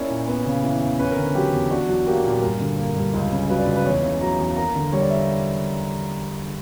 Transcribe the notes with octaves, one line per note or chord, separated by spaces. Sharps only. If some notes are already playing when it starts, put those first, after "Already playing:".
Already playing: A#3 C#4 E4 C#5 D5
A#2
B3
C#3
E3
E2
C#4 B4
A#4
D3
B4
F#3 G4
E2
D4 F#4
F#3
A#3 G4
A#2
G2 A#4
D3
A#3
G2
C#2
C#3
F#3 B4
D5
C#2
B4
E2 C#5
C#3
F#3 A#5
E2
A#3 A#5
D3
G3 C#5
D5
E5